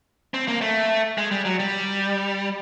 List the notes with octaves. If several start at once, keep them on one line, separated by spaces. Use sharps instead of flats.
C4
A#3
A3
G#3
G3
F#3
G3